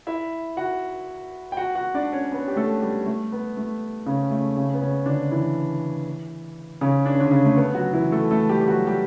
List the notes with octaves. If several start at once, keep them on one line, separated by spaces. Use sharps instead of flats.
E4 E5
F#4 F#5
G5
F#4 F#5
F#4 F#5
D4 D5
C#4 C#5
B3 B4
G4
A3 A4
G3 G4
A3
B3
A3
C#3 C#4
A3
C#3 C#4
B3
C#3 C#4
D3 D4
E3 E4
C#3 C#4
D4
C#4
D3 D4
C#3 C#4
A3
B3
F#3 F#4
E3 E4
A3 A4
A3 A4
G3 G4
G4
F#3 F#4
G3 G4